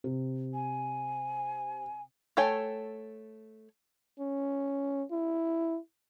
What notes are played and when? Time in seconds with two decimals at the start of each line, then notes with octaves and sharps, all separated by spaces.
0.04 C3
0.54 G#5
2.37 A3 A4 C#5 G5 G#5
4.20 C#4
5.12 E4